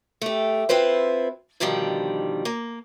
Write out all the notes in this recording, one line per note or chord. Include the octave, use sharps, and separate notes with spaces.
A3 G4
C4 E4 F4 B4 C5
B2 D3 D#3 F3 G3
A#3